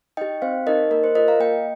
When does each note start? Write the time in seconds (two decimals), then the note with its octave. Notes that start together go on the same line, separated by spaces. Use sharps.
0.17 D#4 G4 D#5 G5
0.42 C4 C5 F5
0.66 D#4 G4 A#4 D#5
0.91 A#3 A#4 D#5
1.04 C5
1.15 F4 A#4 D#5
1.28 F5 A#5
1.40 A#3 D#5 G5